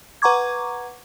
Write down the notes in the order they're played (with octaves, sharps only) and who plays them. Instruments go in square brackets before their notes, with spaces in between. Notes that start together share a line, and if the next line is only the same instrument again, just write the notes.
[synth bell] B4 F#5 A#5 C#6 D6 G#6